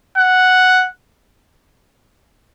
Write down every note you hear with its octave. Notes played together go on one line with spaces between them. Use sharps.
F#5